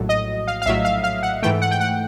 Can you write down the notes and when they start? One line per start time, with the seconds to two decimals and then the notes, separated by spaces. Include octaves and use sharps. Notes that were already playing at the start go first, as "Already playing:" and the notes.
Already playing: A#1 A2 F#3
0.09 D#5
0.47 F5
0.62 F5
0.66 A#1 A2 F#3 E5
0.85 F5
1.04 F5
1.23 F#5
1.42 G#2 E3 A3 G5
1.62 F#5
1.71 G5
1.80 F#5